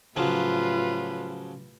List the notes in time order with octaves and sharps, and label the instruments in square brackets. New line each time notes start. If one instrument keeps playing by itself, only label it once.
[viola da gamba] A2 G4 B4 [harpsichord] C#3 F3 F#3 [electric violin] F4